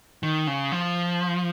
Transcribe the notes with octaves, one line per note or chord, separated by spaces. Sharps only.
D#3
C#3
F3